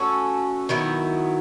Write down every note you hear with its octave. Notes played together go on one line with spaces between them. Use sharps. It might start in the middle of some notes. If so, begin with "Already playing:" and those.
Already playing: A3 C#4 F#4 A4
D#3 F#3 B3 E4